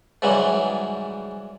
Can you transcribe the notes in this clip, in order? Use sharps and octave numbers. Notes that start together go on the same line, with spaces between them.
G#2 C#3 E3 F#3 G3